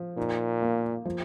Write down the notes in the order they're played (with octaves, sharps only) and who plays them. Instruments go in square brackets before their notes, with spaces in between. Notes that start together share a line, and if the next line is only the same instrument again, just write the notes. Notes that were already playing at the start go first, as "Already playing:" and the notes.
Already playing: [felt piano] F3
[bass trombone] A#2 [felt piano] D#4
[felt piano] A#3
F3